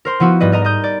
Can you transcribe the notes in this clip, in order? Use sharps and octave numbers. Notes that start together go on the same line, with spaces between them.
A#4 C5 C6
F3 B3 E4 F#4
G#2 G3 B4 D#5
A#4 D#5 A#5
D#5 D#6 G6
D5